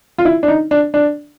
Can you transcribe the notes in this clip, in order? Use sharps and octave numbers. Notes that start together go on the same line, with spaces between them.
F4
E4
D4
D#4
D4
D4